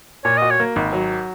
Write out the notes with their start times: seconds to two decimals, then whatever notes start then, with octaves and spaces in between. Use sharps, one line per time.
0.25 A#2 C#5
0.37 F#4 D#5
0.50 C#5
0.60 A#3
0.76 G#1
0.93 F#3